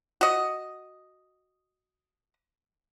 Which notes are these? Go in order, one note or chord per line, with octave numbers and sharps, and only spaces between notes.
F#4 D#5